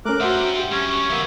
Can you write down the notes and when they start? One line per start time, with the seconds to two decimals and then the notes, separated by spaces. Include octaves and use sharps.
0.05 A3 C#4 A#4 D6 F#6
0.20 G2 F#4 C5 E5 F#5
0.59 G4 G5
0.72 F#2 C#4 C#5
1.10 F#2 D#3 A#3 B3 E5